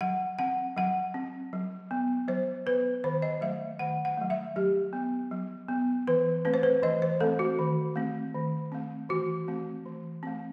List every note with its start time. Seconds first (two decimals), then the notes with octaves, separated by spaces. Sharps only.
0.01 F#3 F#5
0.39 C4 F#5
0.77 F#3 F#5
1.14 C4
1.53 F#3
1.91 B3
2.28 F#3 C5
2.66 B3 B4
3.04 D#3 C5
3.22 D#5
3.41 F#3 A3 E5
3.79 D#3 F#5
4.05 F#5
4.18 F#3 A3
4.30 E5
4.56 F#3 G4
4.93 B3
5.31 F#3
5.68 B3
6.07 E3 B4
6.45 A3 C4 B4
6.54 C5
6.63 B4
6.82 E3 D#5
7.02 C5
7.21 A3 C4 A4
7.39 F#4
7.59 D#3
7.96 A3 C4
8.35 D#3
8.72 A3 C4
9.09 E3 F#4
9.48 A3 C4
9.86 E3
10.23 A3 C4